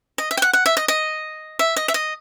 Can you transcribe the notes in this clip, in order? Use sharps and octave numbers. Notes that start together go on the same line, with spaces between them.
D#5
E5
G5
F#5
F#5
E5
D#5
D#5
E5
D#5
E5
D#5